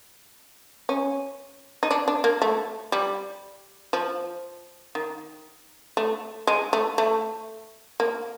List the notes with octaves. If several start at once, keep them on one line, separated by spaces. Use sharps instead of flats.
C#4
D#4
D4
D4
A#3
A3
G3
F3
D#3
A3
G#3
A3
A3
A#3